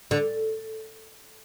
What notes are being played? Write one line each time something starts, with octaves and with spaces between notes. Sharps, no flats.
D3